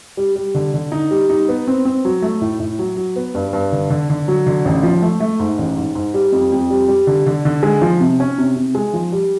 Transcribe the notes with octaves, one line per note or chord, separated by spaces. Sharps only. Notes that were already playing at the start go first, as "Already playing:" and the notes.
G3
G3
D3
D3
D#4
G3
D#4
B3
C4
C4
F#3
A3
A2
A2
F#3
F#3
B3
G2
G2
D3
D3
D3
F#3
D3
A1
F3
A3
A3
G#2
A1
G#2
G#2
G3
F2
F2
G3
G3
D3
D3
D3
G#3
F3
C3
C#4
C3
C3
G#3
F3
G3